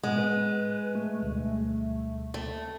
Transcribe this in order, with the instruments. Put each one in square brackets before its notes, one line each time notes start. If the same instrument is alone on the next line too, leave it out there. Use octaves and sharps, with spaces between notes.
[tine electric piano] A2 [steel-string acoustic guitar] G#3 [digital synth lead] B3
[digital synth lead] B4
A3
[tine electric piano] D2 B2 G3
[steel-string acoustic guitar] A3 [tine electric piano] A4